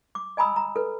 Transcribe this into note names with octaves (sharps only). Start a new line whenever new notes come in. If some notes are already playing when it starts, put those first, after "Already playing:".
D6
D#5 G#5 A#5 B5 D#6 E6
A#5
A4 B4